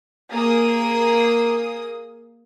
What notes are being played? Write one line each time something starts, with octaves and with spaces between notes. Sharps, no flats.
A#3 G#4 D#6